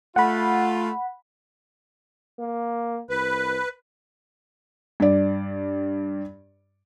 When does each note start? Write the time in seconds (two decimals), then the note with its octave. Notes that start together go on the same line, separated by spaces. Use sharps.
0.16 A3 F4 F#5 B5
2.39 A#3
3.10 C2 B4
5.00 G2 D5